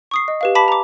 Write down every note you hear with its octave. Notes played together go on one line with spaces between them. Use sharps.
C#6 D#6 C7
D#5
G4 B4 F5
A5 B5 D6 B6
A#5 D6